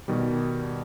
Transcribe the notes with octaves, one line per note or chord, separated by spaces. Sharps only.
B2 D#3 G3